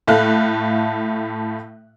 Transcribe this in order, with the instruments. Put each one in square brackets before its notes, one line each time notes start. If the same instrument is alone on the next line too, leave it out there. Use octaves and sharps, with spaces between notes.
[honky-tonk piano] A2 A3 F5 F#6